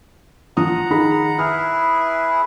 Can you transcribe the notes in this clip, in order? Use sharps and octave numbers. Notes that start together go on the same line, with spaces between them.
F3 F#5 A#5 D#6
D#3 G#4 B5
E4 G#4 B4 F6